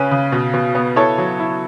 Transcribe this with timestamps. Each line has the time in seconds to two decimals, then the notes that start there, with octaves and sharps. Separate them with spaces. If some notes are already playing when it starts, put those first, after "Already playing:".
Already playing: C#3 C#4 B4
0.11 C#3
0.32 B2
0.54 B2
0.75 B3
0.96 E4 A4 C#5
1.18 F#3
1.39 E4